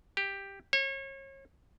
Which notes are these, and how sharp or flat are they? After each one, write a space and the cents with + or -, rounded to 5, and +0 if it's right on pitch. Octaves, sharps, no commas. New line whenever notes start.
G4 +5
C#5 -35